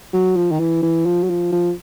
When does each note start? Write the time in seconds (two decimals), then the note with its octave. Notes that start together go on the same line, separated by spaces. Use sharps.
0.13 F#3
0.36 F3
0.52 D#3
0.60 E3
0.83 E3
1.06 F3
1.23 F#3
1.30 F3
1.52 F3